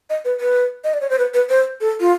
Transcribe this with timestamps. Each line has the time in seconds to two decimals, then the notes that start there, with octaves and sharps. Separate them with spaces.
0.10 D#5
0.25 B4
0.40 B4
0.84 D#5
0.94 D5
1.01 C#5
1.10 C5
1.18 B4
1.34 B4
1.49 C5
1.81 A4
2.00 F4